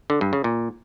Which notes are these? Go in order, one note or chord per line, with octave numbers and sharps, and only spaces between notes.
D3
G2
C#3
A#2